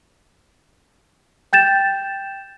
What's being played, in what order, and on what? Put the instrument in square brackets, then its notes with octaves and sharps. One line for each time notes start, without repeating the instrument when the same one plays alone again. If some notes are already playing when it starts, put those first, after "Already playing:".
[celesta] G5 G6 A6 E7